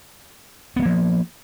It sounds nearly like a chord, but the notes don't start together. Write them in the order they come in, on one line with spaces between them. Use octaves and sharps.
B3 F#3 A#3 F3